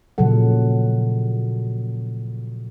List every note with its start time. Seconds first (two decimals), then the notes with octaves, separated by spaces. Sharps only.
0.18 A#2 C#3 F3 F#3 A4 F#5